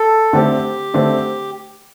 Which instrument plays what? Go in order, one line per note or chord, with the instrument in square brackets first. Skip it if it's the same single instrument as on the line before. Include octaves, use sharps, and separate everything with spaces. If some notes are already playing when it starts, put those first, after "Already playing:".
Already playing: [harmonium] A4
[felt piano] D3 A3 C4 [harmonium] G4
[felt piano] D3 A3 C4